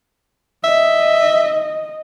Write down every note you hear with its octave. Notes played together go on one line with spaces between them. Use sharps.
D#5 E5